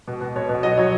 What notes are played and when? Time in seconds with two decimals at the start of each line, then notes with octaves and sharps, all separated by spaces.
0.08 B2
0.21 B2
0.36 B2 C#5
0.49 B2
0.63 F#3 D#5
0.78 F#3 C#5